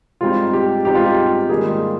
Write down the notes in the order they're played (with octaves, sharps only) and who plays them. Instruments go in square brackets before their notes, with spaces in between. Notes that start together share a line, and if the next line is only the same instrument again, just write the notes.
[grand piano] G#2 G3 C4 D#4 [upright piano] F4
[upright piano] G4
[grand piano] G#2 G3 C4 D#4 [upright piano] G4
[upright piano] F4
G4
[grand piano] G#2 D#3 G3 A#3 [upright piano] G#4
[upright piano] F4